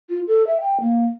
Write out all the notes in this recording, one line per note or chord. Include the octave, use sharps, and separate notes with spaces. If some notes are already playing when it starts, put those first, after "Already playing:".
F4
A4
E5
G5
A#3